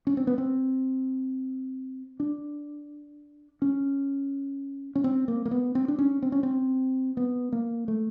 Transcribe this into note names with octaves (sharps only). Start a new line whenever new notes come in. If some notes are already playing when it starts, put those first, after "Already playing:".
C#4
C4
B3
C4
D4
C#4
C#4
C4
A#3
A#3
B3
C4
D4
C#4
C4
C#4
C4
B3
A#3
A3